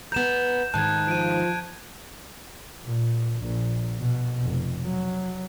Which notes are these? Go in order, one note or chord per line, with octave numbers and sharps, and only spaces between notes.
B3 A#5 G6 E7
G#2 D#3 A5 F#6 G#6
F3 D7 D#7
A#2
A#1 A#2
B2
F1
F#3